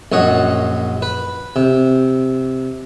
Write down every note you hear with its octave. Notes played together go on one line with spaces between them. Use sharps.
A#1 F#2 C#5 D#5 F#5
B4
C3